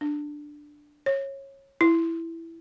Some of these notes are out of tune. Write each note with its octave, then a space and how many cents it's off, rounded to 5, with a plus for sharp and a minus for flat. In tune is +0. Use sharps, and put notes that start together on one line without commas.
D4 +5
C#5 -20
E4 +5